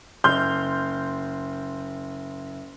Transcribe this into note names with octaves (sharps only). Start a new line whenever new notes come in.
F#1 C6 F6 G6 G7